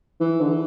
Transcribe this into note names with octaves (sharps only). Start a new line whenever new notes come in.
E3
D3
E3